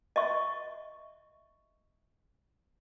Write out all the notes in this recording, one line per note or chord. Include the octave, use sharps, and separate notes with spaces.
D#5 E5 C#6